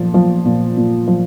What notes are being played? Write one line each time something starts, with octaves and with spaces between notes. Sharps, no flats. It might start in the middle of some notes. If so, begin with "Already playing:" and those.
Already playing: A#2 F3
F3
A#2
A#2
F3